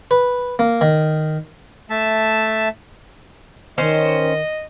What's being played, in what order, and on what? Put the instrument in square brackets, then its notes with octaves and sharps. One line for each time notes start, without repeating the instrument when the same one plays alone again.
[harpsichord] B4
A#3
D#3
[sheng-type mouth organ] A3 E5 A5
[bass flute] D#3 [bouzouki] C#4 C5 [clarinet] D#5